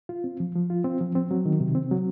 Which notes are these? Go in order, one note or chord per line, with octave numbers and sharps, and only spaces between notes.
F4
C4
F3
F3
F4
C4
F3
C4
F#3
D#3
C3
C4
F#3